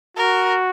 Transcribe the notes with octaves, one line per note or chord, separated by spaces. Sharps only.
F#4 A#4